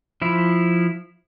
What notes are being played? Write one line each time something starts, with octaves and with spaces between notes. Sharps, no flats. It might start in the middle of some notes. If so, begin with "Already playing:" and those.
F3 E4